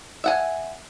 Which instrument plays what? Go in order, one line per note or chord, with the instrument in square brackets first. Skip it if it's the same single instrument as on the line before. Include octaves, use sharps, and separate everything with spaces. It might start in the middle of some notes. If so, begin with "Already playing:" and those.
[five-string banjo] E5 F#5 G#5